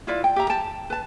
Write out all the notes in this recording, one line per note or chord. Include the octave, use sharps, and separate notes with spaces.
E4 F4 B4 D5
G5
G4 E5 A#5
G5 A5
B4 A5